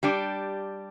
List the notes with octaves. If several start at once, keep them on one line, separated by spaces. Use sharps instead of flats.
G3 D4 G4